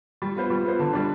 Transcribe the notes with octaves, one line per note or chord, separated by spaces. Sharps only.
G3
B3 F4 C5
G3
B3 F4 C5
D3
G3 D4